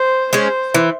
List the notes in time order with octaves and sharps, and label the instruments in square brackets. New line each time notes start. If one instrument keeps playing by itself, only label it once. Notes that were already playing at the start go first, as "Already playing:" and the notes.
Already playing: [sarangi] C5
[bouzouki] G#3 C#4 [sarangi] C5
[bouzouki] E3